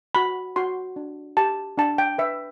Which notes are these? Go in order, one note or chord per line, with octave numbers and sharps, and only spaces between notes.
F#4 B5
F#4 C6
D4
G4 A5
D4 A5
G5
B4 E5